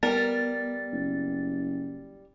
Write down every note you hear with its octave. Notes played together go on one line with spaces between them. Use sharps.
G3 B3 A#4 A6
F#1